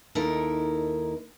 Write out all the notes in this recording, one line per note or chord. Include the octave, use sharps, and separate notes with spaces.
D#2 D#4 E4 A4 A#4